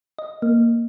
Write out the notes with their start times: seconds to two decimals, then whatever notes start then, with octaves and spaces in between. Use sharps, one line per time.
0.19 D#5
0.42 A#3